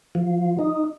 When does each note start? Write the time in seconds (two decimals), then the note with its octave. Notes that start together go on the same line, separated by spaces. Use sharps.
0.15 F3
0.59 D#4